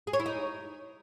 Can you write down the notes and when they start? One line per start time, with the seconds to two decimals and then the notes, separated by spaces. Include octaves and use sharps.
0.07 G#4
0.13 C#5
0.20 E4
0.26 D#4